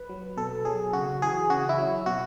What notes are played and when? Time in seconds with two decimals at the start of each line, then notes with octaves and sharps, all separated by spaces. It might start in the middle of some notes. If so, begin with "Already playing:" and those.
Already playing: B4
0.09 F#3
0.37 B2 A4
0.65 F#3 G#4
0.93 C#3 F#4
1.22 E3 G#4
1.50 C#3 F#4
1.69 E4
1.78 F#3
2.06 B2 F#4